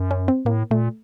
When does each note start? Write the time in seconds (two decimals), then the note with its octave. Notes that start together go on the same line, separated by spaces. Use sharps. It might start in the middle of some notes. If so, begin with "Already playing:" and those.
Already playing: F#2
0.11 C#4
0.28 C4
0.45 A2 A#3
0.71 A#2 A3